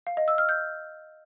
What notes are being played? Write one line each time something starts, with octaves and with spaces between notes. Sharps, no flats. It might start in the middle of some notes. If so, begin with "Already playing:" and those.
F5
D#5
E6
F6
G6